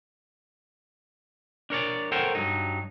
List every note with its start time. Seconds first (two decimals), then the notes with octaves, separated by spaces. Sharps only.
1.70 D4 A#4 C#5 D5
2.12 A4 A#4 C5 C#5 F#5 G5
2.35 G2 F#3 D#4